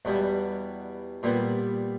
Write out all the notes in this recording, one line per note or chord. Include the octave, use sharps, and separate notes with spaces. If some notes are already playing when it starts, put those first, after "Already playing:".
E2 B2 G3 B3
A#2 G3 B3